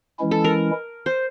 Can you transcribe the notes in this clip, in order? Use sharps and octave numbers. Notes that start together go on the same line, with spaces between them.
E3 G#3 C#4 E4
A4
A#4
C5